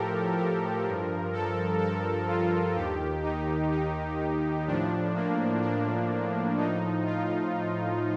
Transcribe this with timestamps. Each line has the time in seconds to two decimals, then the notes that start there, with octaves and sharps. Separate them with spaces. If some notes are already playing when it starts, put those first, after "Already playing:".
Already playing: A2 F3 G4 A4 A#4
0.37 A#4
0.84 G2 F3
1.33 A4
1.81 A4
2.28 F4
2.75 D#2 D#3 G4
3.23 D#4
3.72 D#4
4.67 A2 F3 D4
5.15 A#3
5.62 D4
6.57 A2 F3 D#4
7.05 F4